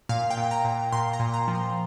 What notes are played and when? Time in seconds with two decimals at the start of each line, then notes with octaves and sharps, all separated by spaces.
0.09 A#2 F5
0.31 G5
0.37 A#2
0.51 A#5
0.65 A#2
0.92 A#2 C6
1.13 A#5
1.20 A#2
1.34 A#5
1.48 F3
1.55 C6